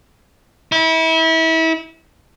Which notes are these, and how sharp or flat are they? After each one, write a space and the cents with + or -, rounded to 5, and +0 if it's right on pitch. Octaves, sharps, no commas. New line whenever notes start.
E4 -30